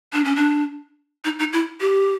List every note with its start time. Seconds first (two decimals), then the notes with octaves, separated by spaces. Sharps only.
0.13 D4
0.24 C#4
0.36 D4
1.25 D#4
1.39 D#4
1.53 E4
1.81 G4